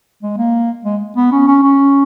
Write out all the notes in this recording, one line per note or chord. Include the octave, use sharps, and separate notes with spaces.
G#3
A#3
G#3
B3
C#4
C#4
C#4